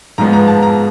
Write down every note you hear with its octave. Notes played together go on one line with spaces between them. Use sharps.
G#2 F3 G#3 B3 A#5
A#5
A5
A#5